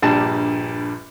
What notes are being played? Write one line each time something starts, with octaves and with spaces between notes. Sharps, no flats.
A#1 G2 A#2 G3 A5